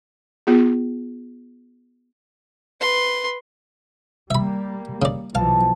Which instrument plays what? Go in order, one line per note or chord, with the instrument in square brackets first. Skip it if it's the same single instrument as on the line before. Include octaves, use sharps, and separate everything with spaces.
[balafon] B3 F4 G#4
[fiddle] B4 C6
[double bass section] G3 A#3 [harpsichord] E5 B5
[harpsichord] C#3 D5
[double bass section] B1 E3 F3 [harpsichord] F5 [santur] A5